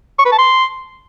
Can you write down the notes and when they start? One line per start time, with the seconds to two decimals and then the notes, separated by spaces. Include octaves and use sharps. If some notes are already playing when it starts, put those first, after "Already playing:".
0.19 C#6
0.26 B4
0.32 A5
0.39 C6